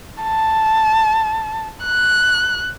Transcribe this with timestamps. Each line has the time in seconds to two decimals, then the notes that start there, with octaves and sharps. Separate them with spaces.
0.23 A5
1.85 F#6